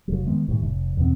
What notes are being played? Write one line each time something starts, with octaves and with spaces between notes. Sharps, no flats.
F1 F#3
D#3 G#3 B3
B1 A2 D#3 G3
F1
E2 B2 C4